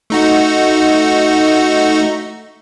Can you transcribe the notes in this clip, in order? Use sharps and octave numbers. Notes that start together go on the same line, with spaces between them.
A3 D#4 F#4